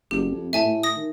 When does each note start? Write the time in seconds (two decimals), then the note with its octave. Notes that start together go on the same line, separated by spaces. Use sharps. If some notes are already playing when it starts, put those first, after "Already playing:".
0.11 F#1 G4
0.31 F2
0.53 A2 E5 G#5 A5
0.66 A2
0.83 D#6 A#6
0.96 D#3